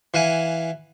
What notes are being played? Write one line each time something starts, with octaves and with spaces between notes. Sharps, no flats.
E3 F5 F#5 G#5